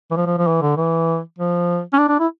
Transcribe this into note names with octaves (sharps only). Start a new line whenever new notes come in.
E3
F3
F3
F3
E3
D3
E3
F3
C#4
D4
D4
E4